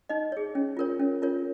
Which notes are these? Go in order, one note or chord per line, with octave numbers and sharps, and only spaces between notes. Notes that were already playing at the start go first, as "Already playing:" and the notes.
D#4 D#5
G#4 C#5
C#4
F4 A#4 C#5
C#4
F4 A#4 C#5